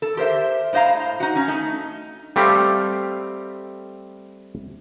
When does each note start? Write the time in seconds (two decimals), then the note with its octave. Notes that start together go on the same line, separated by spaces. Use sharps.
0.02 A4
0.17 G4 A#4 C5 E5
0.73 A2 C5 D#5 F5 A#5
1.20 D#4 F#4
1.36 C#4
1.48 A3 D#4
2.36 G3 A3 C4 G4 F5